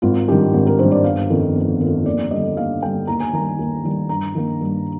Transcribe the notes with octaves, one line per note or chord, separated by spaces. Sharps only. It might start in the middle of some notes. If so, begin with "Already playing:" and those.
G#1 F4
G2 D#3 G4
G#1
A#4
G2 D#3 C5
D5
G1 F5
F2 D#3
G1
F2 D#3
D#2 D5
D3 G3 D#5
D#2 F5
D3 G3 G5
D#2 A#5
G#5
D#3 G3 A#5
D#2
D#3 G3
G2 A#5
D#3 A#3
G2